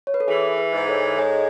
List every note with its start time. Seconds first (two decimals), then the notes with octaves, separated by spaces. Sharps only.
0.07 C#5
0.14 B4
0.20 A4
0.28 E3 G#4
0.58 G#4 B4
0.73 G#2 D#5
0.88 A4 C#5
1.18 G#3 A4 C#5